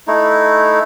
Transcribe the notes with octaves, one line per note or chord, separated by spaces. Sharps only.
A3 D#4 E4